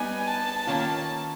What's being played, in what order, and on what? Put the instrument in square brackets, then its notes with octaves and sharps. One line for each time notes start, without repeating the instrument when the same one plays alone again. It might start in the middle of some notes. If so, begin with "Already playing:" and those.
Already playing: [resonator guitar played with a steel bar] G3 B3 D#4 [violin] G#5
[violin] A5
[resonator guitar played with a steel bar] D#3 F#3 A#3 C#4 F4